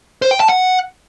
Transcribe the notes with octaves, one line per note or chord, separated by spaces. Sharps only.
C5
G5
A5
F#5